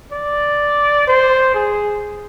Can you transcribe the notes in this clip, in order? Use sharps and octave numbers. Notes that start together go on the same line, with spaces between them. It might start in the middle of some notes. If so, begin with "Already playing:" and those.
D5
C5
G#4